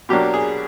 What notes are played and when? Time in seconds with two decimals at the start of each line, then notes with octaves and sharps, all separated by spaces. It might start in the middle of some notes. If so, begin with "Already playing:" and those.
0.09 B2 F#3 A#3 D4 G4
0.34 G#4